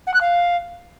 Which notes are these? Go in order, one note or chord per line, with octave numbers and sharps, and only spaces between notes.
F#5
F#6
F5